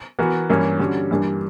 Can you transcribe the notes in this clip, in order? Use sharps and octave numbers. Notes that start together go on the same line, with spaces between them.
E3 B3 F#4 A#4
G2 E3 A#3 C#4
D3 G3 C#4 F#4
G2 E3 G3 A#3 D4